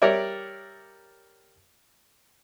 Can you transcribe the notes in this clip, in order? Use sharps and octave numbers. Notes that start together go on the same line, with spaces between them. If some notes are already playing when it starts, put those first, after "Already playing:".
G3 A#4 C#5 D5 E5